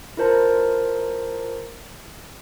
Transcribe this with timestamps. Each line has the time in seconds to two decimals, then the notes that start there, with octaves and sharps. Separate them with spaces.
0.17 E4 F4 A#4 C5 A5 A#5